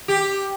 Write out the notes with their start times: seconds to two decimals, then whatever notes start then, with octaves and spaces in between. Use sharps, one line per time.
0.08 G4